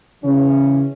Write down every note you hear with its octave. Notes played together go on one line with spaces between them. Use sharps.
C#3 E3 C#4